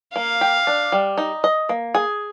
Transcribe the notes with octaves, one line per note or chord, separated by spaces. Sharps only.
A#3 F5
G4
D4
G3
D#4
D#5
A#3
G#4